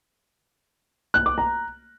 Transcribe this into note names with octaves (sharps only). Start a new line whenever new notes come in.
F#6
D6
A#5